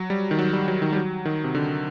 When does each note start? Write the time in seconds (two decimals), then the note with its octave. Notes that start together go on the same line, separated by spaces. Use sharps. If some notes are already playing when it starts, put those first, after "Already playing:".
Already playing: F#3
0.10 G3
0.31 D#3
0.39 F#3
0.53 G3
0.68 F#3
0.82 D#3
0.92 G3
0.96 F#3
1.25 D#3
1.44 C3
1.55 D3